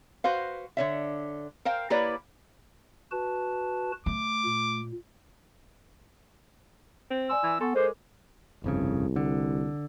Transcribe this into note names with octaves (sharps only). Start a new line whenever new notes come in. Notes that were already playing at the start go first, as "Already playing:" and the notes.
F#4 B4 C5 F5
D3 C#5 E5
A#4 C5 F5 G5
A#3 E4 G4 B4 C#5 D5
F#4 B4 A5
A3 D6
A#2
C4
D5 G#5 C6 E6
E3
B3 A4 G#5 C6 C#6
G#3 A4 A#4 C5 D6
G1 C2 F2 C#3
D3